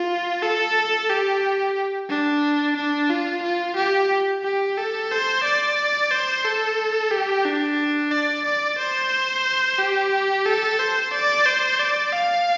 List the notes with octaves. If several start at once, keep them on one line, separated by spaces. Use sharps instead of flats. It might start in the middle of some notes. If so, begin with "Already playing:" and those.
Already playing: F4
A4
G4
D4
D4
F4
F4
G4
G4
A4
C5
D5
C5
A4
G4
D4
D5
D5
C5
G4
A4
C5
D5
C5
D5
F5